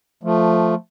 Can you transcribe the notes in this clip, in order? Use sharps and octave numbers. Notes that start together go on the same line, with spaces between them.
F3 A3